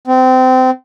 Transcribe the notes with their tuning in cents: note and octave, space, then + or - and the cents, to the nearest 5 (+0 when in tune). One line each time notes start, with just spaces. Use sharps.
C4 -25